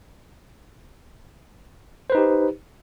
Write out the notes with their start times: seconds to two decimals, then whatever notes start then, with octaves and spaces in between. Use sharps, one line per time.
2.10 C5
2.12 B4
2.15 D#4
2.17 G4